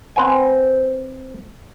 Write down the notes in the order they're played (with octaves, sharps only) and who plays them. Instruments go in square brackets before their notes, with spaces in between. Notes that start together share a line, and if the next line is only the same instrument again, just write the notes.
[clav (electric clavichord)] C4 B4 C5 F#5 G#5